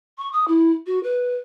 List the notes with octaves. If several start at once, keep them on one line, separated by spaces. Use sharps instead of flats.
C#6
D#6
E4
F#4
B4